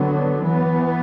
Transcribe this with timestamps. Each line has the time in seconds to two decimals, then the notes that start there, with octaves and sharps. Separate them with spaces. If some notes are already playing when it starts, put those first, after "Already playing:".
Already playing: D3 F#3 B3
0.41 E3 B3